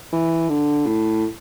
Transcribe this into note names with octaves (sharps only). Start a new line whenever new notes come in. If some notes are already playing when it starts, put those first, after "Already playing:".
E3
D3
A2